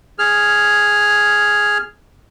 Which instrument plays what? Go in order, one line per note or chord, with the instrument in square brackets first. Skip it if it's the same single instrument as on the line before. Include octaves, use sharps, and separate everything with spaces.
[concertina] G#4 F6